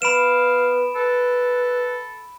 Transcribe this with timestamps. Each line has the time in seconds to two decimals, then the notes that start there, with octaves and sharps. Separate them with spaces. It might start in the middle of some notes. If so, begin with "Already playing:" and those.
0.02 B3 F5 B5 D7 E7
0.96 A4 B4